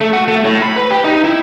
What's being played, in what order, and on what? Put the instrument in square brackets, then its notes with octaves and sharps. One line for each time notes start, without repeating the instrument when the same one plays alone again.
[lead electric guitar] A3
F#4
A3
A2
B5
B4
G4
D#4
E4